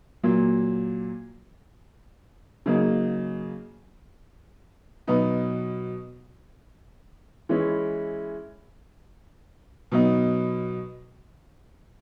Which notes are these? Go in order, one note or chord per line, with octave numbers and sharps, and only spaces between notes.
A#2 F#3 A#3
C#3 F#3 A#3 D#4
B2 F#3 B3 D#4
E3 G#3 C#4 E4
B2 F#3 B3 D#4